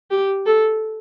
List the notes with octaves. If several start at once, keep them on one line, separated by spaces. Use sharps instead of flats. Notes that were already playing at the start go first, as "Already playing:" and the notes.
G4
A4